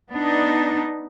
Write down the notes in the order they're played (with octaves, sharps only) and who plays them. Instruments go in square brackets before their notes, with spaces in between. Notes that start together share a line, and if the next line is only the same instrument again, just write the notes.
[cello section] B3 D4 D#4